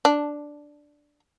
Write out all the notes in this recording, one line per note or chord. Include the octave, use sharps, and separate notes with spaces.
D4